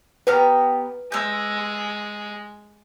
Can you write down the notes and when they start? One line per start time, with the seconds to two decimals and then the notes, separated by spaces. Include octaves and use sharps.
0.27 B3 G4 B4 A#5 F6
1.12 G#3 E6 G6